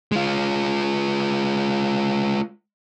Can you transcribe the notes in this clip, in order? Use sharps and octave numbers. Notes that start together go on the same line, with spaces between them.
G#3 F4